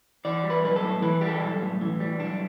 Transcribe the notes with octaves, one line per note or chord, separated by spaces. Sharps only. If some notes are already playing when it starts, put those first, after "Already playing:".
E3 D5
G3
B4
B1 B4
A4
A2
E3 B4
G3 G4
A4
B1
A2
E3
G3
B1 D4